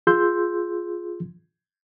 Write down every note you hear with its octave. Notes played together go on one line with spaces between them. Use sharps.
F4 G#4 C6 E6 G6